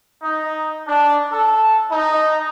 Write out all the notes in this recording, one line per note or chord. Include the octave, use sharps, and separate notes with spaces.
D#4
D4
A4
D#4